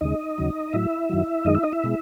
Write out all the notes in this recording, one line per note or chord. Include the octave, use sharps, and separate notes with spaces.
D#2 C#3 G#3 D#4 D#5
D#2 C#3 F#3
A2 F#3 E4 E5
F#2 D#3 F#3
F#2 D#3 G#3 D#4 D#5
E4 E5
D#4 D#5
E4 E5
B2 G#3